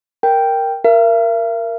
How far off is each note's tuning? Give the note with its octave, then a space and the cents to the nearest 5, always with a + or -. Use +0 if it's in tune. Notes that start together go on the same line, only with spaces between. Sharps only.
A#4 +0 G5 +0
A#4 +0 E5 +45